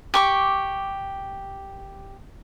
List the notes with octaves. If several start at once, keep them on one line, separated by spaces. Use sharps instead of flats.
G4 C#6 D6